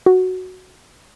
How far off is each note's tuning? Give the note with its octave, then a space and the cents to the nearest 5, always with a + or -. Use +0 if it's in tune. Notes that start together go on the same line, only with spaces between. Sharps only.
F#4 +0